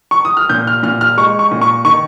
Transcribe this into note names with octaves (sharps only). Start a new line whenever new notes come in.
C#6
D#6
F6
A#2 G6
F6
A#2 F6
F6
G#3 C#6
C#6
A#2
C#6
D#3 C#6